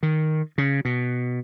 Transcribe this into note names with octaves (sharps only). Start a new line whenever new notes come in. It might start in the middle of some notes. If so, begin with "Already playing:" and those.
D#3
C#3
B2